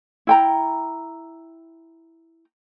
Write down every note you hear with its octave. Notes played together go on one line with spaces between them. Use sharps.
E4 G5 A#5